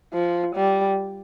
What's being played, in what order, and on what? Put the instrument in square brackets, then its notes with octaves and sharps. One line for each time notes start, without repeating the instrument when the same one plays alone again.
[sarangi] F3
G3